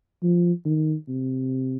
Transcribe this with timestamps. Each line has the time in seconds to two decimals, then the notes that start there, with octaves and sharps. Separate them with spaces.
0.23 F3
0.65 D#3
1.09 C3